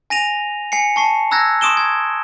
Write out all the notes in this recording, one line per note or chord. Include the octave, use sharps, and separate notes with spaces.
G#5 A#6 D#7 F7
G#5 C7 C#7
A5 C#6 C7
A#5 E6 F#6 G#6 A#6
C6 C#6 D#6 D7 E7 G7
G#6